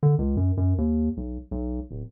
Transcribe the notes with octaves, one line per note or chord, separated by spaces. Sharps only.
D3
C#2
F#2
F#2
D#2
B1
B1
D1